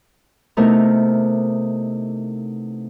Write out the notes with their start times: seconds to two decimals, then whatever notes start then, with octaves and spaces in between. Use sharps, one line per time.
0.57 C3 A3 B3 D#4 E4 A#4